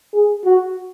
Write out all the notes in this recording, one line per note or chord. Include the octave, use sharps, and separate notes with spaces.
G#4
F#4